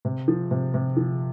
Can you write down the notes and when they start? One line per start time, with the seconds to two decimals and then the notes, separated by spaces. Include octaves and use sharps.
0.05 C3
0.28 F3
0.51 C3
0.74 C3
0.97 F3